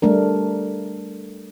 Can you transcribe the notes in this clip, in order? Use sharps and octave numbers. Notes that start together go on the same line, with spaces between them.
G3 A3 D4 A#4